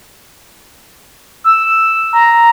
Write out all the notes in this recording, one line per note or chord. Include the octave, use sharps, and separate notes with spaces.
E6
A#5